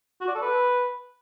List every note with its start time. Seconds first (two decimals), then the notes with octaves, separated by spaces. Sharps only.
0.21 F#4
0.28 D5
0.35 A4
0.42 B4